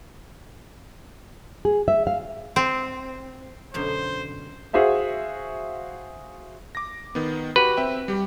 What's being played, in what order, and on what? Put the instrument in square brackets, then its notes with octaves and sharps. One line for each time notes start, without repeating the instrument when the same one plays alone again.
[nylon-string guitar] G#4
E5
F5
[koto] C4
[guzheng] F#2 B2 D3 [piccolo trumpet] C5
[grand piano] F#4 G#4 C5 E5 F5
[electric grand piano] D6 A#6
D#3 B3
[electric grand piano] F#4 G4 [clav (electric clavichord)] B4
[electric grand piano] C4 E5 G5
G3 G4